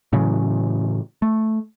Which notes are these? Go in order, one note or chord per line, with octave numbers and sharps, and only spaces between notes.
A2 C#3 E3 F#3
A3